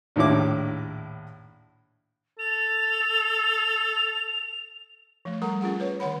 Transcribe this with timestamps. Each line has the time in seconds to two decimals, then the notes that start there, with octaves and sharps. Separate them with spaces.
0.16 A#1 D#2 A2 E4 D6
2.39 A4 F7
5.25 F3 A3
5.42 G3 A4 A#4 F#5 A#5
5.61 C#4 F4 G#4 F#5
5.80 B4 C#5
6.00 D3 D#3 C#5 F#5 B5